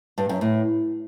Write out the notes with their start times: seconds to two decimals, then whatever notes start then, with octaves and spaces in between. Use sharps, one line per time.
0.18 G2
0.29 F#2
0.41 A2